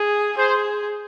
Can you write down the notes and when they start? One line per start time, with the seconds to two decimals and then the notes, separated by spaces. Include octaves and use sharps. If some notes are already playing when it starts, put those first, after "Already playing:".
Already playing: G#4
0.37 G#4 C5